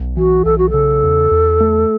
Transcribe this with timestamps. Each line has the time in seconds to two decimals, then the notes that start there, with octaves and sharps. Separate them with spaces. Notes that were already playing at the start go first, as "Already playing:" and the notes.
Already playing: B1
0.17 E3 F#4
0.45 B1 A4
0.58 F#4
0.70 C#3 A4
1.03 E2
1.31 E2
1.60 A3